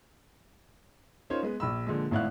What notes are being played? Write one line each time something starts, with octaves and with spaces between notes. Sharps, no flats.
C#4 D#4 F4 A#4 C5 C#5
G#3 B3
A#1 B5 E6
A#2 D3 F3 G#3
G#1 A2 E4 F5 F#5 F#6